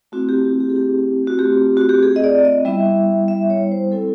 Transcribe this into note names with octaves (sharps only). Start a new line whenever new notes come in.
A3 C4 E4 F#4
G4
F#4
G4
G#4
G4
F#4
A3 C4 F4 G4
F#4
G4
G#4
D#5
D5
D#5
G3 B3 E4 E5
E5
C#5
C5
G#3 C4 E4 A4